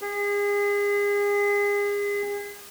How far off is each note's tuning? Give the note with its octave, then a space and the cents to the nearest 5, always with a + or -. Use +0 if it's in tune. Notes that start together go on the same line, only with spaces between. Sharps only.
G#4 -30